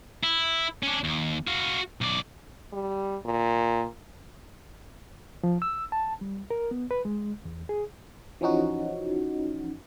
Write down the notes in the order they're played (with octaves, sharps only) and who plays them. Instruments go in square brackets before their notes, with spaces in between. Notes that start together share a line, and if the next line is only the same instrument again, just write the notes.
[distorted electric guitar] E4
C#4 D4
D#2
F#4 F5
B1 D5
[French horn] G3
A#2
[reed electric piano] F3
E6
A5
G3
A#4
B3
B4
G#3
E2
G#4
[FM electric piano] E3 F3 C#4 D#4 F#4